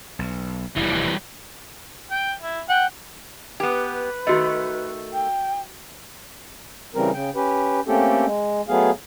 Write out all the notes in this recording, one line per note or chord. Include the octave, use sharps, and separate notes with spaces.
B1
F1 D#2 E3 G3
G5
E4
F#5 G5
B3 G4 B4
D#3 A3 F#4 D#5
G5
C#3 E3 G3 C4 A#4
C#3 G5
C#4 G4 B4
A3 A#3 C4 C#4 G4 A4
G#3
F#3 A3 B3 G#4 F5